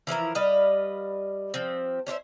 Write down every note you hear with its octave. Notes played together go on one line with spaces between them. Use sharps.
E3 F3 E4 A#4
G3 B4 D#5 F5
F3 C4
C#4 D4 C5 E5